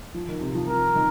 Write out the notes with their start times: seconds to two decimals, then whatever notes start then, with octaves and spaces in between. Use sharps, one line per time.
0.14 F3
0.28 D#3
0.41 C3
0.55 F3
0.68 F3 A#4
0.96 D#3